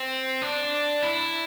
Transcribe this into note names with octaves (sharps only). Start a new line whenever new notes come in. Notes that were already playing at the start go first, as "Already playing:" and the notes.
Already playing: C4
D4
E4